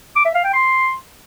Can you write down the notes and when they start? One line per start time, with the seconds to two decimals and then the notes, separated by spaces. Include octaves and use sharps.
0.16 D6
0.25 E5
0.35 F5
0.44 G5
0.53 C6